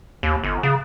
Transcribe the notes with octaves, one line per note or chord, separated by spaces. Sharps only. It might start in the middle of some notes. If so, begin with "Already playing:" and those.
D#2
G1
C#3